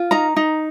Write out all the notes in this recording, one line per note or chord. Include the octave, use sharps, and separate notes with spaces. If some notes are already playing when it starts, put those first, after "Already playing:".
Already playing: F4
D#4 A#5
D#4